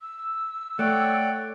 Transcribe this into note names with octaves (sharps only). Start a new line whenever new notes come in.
E6
A3 C#5 D5 F#5 G5